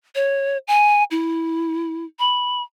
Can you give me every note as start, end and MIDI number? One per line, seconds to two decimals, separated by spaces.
0.15 0.58 73
0.68 1.04 80
1.11 2.05 64
2.19 2.62 83